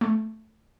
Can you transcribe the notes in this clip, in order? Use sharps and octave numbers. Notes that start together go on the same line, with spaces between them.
A3